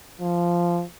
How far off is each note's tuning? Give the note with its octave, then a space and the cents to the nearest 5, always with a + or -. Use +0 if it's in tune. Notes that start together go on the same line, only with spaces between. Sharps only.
F3 -10